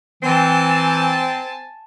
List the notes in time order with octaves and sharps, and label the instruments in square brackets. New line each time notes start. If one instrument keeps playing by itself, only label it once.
[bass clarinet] E3 [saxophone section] C4 [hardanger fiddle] G#5 A5